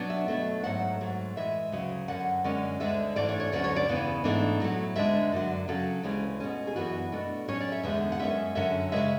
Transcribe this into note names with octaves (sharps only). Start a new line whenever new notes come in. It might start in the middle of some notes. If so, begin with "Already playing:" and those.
Already playing: B2 F#3 B3 D4
E5
B2 F#3 A3
G#2 F#3 A3 F#5
G#2 F#3 A3
A2 E3 G#3 E5
D2 C#3 F#3
F#2 D3 F#3 C#4 F#5
F#2 D3 G#3 C#4
D2 D3 G#3 D4 E5
G#2 E3 A3 D4 D5
C#5
C#5
D2 D3 F#3 C#4 D5
C#5
D5
E2 C#3 E3 B3
G#2 E3 A3 D4
A2 F#3 A3
D2 D3 G#3 D4 E5
F#2 D3 F#3
C#3 F#3 C#4 A4
D2 C#3 E3 G#3 C#4
B2 A3 C#4
G#4
F#2 E3 B3 D4 F#4
B2 A3 D4
A2 F#3 C#4 C#5
D5
E5
E2 D3 G#3 B3 E5
F#5
F#2 E3 G#3 C#4 E5
F#2 D3 F#3 C#4 E5
C#3 E3 G#3 E5